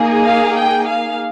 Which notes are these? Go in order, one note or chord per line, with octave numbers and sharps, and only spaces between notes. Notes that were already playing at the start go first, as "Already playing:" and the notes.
Already playing: A#3 D#4 G#4
F5
G5
F5